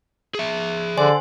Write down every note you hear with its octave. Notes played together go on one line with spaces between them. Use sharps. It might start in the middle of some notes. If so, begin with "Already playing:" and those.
G#4 E5
D3 C5 D5 G#5 C6